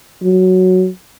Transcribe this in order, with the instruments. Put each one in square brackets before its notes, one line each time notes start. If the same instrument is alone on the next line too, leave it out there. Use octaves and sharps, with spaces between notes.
[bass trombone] F#3